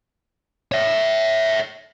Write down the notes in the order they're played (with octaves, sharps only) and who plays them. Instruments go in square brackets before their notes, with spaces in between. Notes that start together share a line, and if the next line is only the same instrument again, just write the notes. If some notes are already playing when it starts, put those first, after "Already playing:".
[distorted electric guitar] C#5 E5